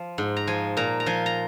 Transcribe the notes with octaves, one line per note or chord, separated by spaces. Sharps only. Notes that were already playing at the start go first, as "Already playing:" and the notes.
Already playing: F3
G#2
A#5
F3 G#5
A#2 A#5
A#5
F3 G#5
A#5